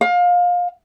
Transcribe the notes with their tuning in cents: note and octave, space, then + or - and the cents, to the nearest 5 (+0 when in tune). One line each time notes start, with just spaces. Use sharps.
F5 +25